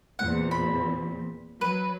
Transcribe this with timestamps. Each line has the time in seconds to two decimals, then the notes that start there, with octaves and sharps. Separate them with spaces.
0.19 E2 A#2 C4 F#5
0.51 B5
1.61 F#3 B4